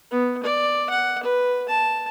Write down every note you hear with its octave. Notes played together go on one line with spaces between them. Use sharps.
B3
D5
F#5
B4
A5